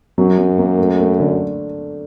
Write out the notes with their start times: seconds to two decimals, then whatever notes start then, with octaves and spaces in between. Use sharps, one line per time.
0.18 F#2 F#3
0.38 F#3
0.58 A#3
0.79 A3
0.99 A3
1.20 D3